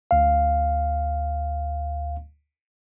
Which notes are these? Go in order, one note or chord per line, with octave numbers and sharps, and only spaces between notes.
D2 F5